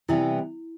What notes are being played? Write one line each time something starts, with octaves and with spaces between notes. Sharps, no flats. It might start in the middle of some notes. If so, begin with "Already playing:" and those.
C3 E3 G3 B3 E4